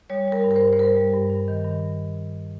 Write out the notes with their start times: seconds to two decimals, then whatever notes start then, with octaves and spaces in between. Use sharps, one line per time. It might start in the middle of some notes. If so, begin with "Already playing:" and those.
0.10 G3 C#5
0.28 G3 A#4
0.44 G2
0.51 A#4
0.56 C5
0.61 G2
0.73 C5
0.79 G3 A#4
0.96 G3
1.13 G2
1.30 G2
1.48 D#3
1.64 G2